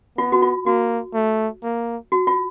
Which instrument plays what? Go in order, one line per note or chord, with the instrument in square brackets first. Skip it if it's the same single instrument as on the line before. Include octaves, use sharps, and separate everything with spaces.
[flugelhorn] B3 [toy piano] F4
[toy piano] F#4
F4
[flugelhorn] A#3 [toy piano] F#4
[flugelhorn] A3
A#3
[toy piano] F#4
F4